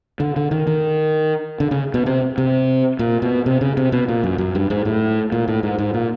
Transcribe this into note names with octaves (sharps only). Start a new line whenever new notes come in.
D3
D3
D#3
D#3
D3
C#3
B2
C3
C3
A#2
B2
C3
C#3
C3
B2
A#2
F#2
F#2
G2
G#2
A2
A#2
A2
G#2
G#2
A#2